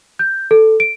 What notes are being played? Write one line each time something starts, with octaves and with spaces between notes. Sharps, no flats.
G6
A4
D7